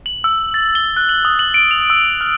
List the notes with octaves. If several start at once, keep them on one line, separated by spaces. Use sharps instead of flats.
F#7
E6
A6
G7
F#6
F#7
D#6
F#7
D7
F7
E6
F6